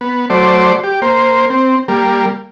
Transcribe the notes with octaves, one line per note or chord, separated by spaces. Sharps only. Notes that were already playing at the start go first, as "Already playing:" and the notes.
B3
F#3 A3 C5 D5
G4
A#3 C5
C4
G3 A#3